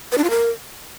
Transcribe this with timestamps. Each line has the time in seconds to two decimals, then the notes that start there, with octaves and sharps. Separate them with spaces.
0.12 B4
0.18 D4
0.24 F4
0.30 A#4